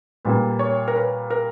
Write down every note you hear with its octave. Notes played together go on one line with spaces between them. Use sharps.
A#2 G3 A#3 B4
C#5
A#4
B4
A#4